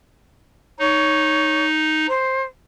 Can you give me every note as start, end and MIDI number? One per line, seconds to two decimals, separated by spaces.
0.79 2.07 63
0.79 1.65 73
2.08 2.43 72